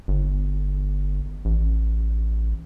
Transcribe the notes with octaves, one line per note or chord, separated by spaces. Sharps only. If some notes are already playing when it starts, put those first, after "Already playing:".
G1
A1